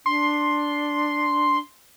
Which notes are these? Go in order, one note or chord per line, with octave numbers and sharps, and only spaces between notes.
D4 C6